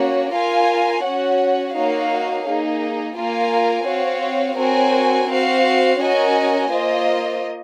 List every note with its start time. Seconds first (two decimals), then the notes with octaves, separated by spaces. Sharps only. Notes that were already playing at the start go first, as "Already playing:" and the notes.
Already playing: A#3 C#4 F#4 C#5
0.32 F4 A#4 F5 G#5
1.03 C#4 F#4 C#5 F#5
1.74 A#3 D#4 F#4 C#5 F5
2.44 A#3 D#4 G#4
3.16 A#3 F4 A#4 F5 G#5
3.86 C4 F#4 C#5 F5
4.58 C4 F#4 A#4 C#5 G#5
5.28 C4 F#4 C5 F5
6.00 C#4 F#4 A#4 D#5 G#5
6.70 A#3 F4 C5 D#5